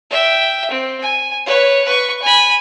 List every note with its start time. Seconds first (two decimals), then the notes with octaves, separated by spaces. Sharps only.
0.10 E5 G5
0.70 C4
1.02 G#5
1.46 B4 C#5
1.84 B4 C#6
2.22 G#5 B5